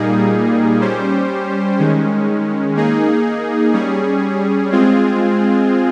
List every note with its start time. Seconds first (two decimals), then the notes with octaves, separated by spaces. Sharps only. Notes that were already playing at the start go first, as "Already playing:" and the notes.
Already playing: A#2 G3 A#3 D#4 G#4
0.81 G3 C#4 G4 C5
1.78 D#3 G#3 C#4
2.75 A#3 D#4 G#4
3.73 G3 C#4 G#4
4.70 G#3 C4 F4 G#4